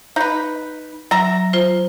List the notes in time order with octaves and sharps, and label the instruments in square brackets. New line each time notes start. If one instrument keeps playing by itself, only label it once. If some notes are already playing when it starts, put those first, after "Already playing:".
[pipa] D#4 B4
[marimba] F#3 [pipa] E5 A#5
[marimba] F4 C5